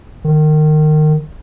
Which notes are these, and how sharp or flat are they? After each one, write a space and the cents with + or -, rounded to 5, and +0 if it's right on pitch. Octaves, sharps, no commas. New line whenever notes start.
D#3 -25